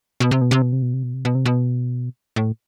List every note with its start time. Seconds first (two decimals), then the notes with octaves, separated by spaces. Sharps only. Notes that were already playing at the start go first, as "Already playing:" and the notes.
0.20 B2
0.31 C3
0.41 B2
0.51 C3
0.62 B2
0.73 C3
0.82 B2
0.94 C3
1.03 B2
1.14 C3
1.25 B2
1.35 C3
1.46 B2
2.36 A2